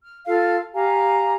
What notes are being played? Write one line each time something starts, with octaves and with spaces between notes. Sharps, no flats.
F6
F4 A4 F5 F6
G4 F5 G#5 A#5